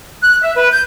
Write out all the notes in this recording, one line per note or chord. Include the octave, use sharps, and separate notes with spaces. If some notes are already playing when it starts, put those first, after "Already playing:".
F#6
E5
B4
G6